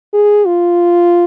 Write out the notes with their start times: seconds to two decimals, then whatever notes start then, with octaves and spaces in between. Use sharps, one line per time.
0.14 G#4
0.47 F4